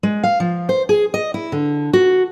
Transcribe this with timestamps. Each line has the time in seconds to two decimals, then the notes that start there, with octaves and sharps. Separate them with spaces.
0.03 G#3
0.23 F5
0.40 F3
0.69 C5
0.89 G#4
1.14 D#5
1.34 E4
1.52 D3
1.93 F#4